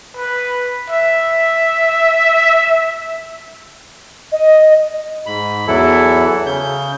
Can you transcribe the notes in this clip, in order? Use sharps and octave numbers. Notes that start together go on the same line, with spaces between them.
B4
E5
D#5
G#2 B5
E2 E3 F#3 E4 A4
C#3 G6